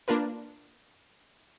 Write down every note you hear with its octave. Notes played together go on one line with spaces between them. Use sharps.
A#3 D4 F4 A#4 B4